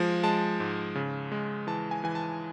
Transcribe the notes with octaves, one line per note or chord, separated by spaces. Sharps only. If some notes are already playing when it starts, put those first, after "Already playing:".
Already playing: F3 G#3
G#3 A5
G#2
C#3
G#3
E3 A5
G#5
E3 G#5
A5